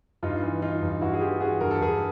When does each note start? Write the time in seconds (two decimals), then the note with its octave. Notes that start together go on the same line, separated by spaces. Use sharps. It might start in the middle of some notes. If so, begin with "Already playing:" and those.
0.23 G2 D#4 F4
0.43 E3
0.62 E3 D#4 F4
0.82 G2
1.02 G2 E4 F#4
1.14 G#4
1.21 E3 F4 G4
1.41 E3 F#4 G#4
1.61 G2 A#4
1.71 A4
1.81 G2 G#4 A#4